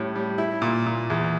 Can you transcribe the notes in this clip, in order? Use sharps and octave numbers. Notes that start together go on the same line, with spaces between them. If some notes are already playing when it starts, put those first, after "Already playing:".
Already playing: A2 G3 C#4
G3
E4
A#2
A#2
E2